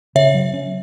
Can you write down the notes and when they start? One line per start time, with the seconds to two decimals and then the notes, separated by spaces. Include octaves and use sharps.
0.15 C#3 C#5 E5
0.34 F#3
0.54 C#4